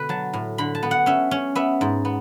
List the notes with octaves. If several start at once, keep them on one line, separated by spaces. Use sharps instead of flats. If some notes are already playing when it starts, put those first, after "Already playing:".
Already playing: B2 D3 B4
F#3 A5
A2
D3 B5
A5
B3
F#5
C#4 E5
C#4
B3 E5
G#2
B3